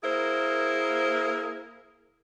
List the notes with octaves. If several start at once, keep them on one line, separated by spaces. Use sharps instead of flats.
A#3 E4 G#4 A#4 C5